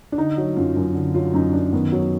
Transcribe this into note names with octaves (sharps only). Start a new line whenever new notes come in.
D4
D3 D#4
F#3
F#2 F4
F#2
D3
F#3 F4
F#2 D#4
F#2 D4
D#3 B3
F#3